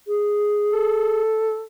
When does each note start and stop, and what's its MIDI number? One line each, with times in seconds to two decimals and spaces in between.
0.08 1.22 68
0.73 1.63 69